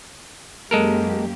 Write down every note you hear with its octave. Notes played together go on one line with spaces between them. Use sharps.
F#2 G#3 A#3 G4 A4 A#4